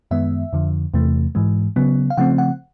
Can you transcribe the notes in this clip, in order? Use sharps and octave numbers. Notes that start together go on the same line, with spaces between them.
F#2 D#3 G#3 B3 E5
F2 D3 F3
E2 C3 E3 A3
G#2 E3 G#3
C#3 F#3 B3
F5
C#3 F3 A3 C4 F#5
F#5